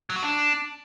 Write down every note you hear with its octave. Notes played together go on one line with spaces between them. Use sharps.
F#3
F#4
D4